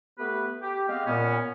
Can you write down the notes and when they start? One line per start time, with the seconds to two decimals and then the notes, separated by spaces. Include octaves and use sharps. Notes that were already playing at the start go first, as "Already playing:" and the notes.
0.18 A3 B3 G4 B4
0.62 G4
0.88 G#3 B3 C4 G4 D#5 F5
1.06 A#2 B3 C#4